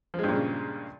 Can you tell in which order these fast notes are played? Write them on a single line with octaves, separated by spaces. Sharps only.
F3 G#3 G2 A#2 C#3